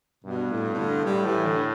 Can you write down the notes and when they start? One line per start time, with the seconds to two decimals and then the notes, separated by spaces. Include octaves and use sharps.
0.24 G2 B2
0.51 A2
0.74 B2
0.78 D3
1.05 A2 G3
1.25 E3
1.46 D3